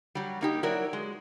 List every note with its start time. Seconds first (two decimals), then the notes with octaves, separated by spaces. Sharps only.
0.15 F#3 G3
0.41 A#3 D#4 G4
0.63 F#3 E4 A#4 D5
0.93 G#3